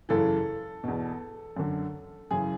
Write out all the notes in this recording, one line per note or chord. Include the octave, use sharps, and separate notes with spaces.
F#2 C#3 E3 A4
E2 B2
F#2 D3
F#2 C#3 E3 G#4